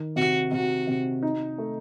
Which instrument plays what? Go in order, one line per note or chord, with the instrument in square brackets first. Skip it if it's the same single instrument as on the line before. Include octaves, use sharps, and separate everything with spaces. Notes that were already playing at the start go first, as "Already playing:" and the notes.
Already playing: [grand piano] D#3
[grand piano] C3 [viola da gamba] F#4
[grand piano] C3 [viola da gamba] F#4
[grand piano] C3
D#4
A3